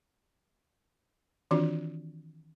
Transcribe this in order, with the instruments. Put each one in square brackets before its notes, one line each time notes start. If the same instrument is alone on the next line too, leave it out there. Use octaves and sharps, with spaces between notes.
[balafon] D#3 E3 C4 D4 F4 F#4